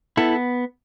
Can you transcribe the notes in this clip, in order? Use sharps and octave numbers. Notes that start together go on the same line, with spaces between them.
B3 E4 A4